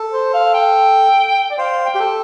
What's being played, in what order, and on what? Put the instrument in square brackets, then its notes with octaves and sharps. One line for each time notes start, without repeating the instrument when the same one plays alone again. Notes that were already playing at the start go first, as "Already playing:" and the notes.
Already playing: [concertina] A4
[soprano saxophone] C5
F5
G5
D5
[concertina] C5 [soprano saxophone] F5
[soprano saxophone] G5
[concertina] G4
A4